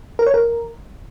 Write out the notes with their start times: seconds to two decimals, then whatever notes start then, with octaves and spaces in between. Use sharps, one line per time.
0.19 A#4
0.27 C#5
0.34 A#4